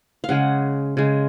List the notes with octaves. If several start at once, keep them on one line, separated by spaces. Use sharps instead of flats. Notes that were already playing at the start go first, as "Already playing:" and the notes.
F5
C#3 G#3 F#5
C#3 G#3